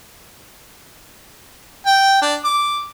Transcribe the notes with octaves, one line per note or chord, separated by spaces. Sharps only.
G5
D4
D6